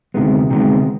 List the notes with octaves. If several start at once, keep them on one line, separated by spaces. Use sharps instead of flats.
D2 C3 D#3 G#3 B3
D2 C3 D#3 G#3 B3